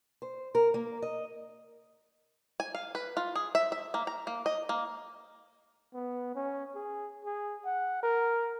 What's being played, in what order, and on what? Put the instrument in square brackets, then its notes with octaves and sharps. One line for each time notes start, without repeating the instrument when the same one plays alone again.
[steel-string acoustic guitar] C5
A#4
A#3
D#5
[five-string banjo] G#5
F5
B4
F4
G#4
E5
E5
A#3
A#5
A#3
D#5
A#3
[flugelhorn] B3
C#4
G#4
G#4
F#5
A#4